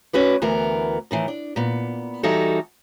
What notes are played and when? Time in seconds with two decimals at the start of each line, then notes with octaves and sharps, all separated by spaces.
0.13 C#4 F#4 B4 D5
0.42 D2 E3 B3 A#4
1.11 A2 D#3 E3
1.28 D4
1.56 A#2 B3
2.23 E3 G3 D#4 F#4 A4